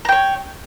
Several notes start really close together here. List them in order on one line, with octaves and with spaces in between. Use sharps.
A#5 G5 C#5